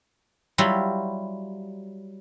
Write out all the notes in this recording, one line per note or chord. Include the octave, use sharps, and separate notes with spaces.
F#3 G3 E4 F4